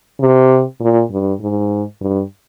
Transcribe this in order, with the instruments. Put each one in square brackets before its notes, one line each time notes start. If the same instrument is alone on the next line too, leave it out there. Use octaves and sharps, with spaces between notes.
[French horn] C3
A#2
G2
G#2
G2